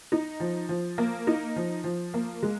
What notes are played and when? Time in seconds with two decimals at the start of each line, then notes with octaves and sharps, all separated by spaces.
0.12 D#4
0.40 F3
0.69 F3
0.98 A#3
1.27 D#4
1.56 F3
1.84 F3
2.14 A#3
2.42 G#3